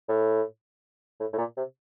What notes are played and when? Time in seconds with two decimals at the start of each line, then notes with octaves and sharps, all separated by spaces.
0.09 A2
1.20 A2
1.33 A2
1.38 A#2
1.57 C3